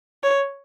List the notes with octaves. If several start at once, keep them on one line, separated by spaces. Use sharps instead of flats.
C#5